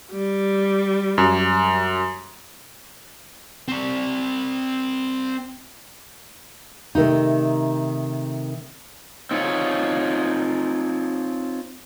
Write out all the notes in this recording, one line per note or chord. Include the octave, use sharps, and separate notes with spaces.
G3
F#2
C4 D5
C3 D#3 A3 D#4
C4 D#4 F4 C#5